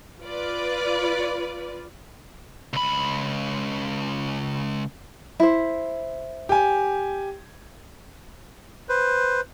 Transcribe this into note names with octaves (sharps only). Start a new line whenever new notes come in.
F4 B4 D5
C#2 B5
E4 C5
G4 G#5
B4 C5